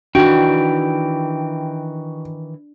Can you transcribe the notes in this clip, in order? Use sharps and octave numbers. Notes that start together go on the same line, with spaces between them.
D#3 E3 D4 F#4 G5